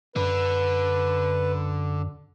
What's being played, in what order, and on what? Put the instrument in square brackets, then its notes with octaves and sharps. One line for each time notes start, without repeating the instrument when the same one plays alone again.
[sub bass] F#2 [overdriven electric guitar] D3 [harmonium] B4